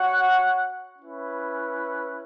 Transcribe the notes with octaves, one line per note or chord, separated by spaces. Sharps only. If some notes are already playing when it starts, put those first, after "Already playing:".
Already playing: F#4 C#5 F#5
C#4 E4 B4